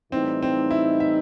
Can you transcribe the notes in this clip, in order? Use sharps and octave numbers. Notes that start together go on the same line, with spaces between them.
A2 E3 G3 C4 D#4
C4
E4
E5